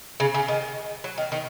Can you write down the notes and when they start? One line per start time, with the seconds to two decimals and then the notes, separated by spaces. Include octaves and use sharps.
0.20 C#3
0.34 C#3
0.48 D#3
1.04 F#3
1.18 D#3
1.32 D#3